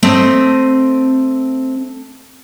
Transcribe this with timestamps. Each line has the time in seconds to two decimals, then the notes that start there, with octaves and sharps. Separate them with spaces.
0.03 A3 C4 D#5